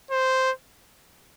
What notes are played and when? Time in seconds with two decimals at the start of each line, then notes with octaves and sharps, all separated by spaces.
0.11 C5